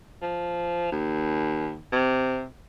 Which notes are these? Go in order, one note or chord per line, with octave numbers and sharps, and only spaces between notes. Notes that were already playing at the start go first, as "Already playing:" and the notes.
F3
D#2
C3